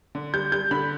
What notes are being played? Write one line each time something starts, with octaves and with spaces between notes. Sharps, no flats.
D3
G3 G6
G3 G6
D3 B5